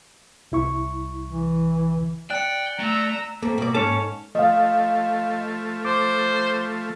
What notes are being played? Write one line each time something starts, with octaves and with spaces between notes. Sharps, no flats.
C2 E4 C#6
E3
D5 G5 F#6 C#7
A3 A#5 E6
A3 A#3 C4
B2 D5
G#2 C#4 A4 C#5 A5
F3 A3 D#5 F5
C5 D6